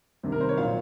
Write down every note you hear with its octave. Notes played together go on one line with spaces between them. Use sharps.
C2 C3 D#3
A#4
C5
C#5
A#2 F#3 F5